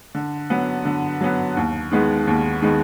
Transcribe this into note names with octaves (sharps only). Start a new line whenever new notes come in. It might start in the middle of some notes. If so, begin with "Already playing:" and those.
D3
F#3 B3
D3
F#3 B3
D#2
D#3 G#3 B3
D#2
D#3 G#3 B3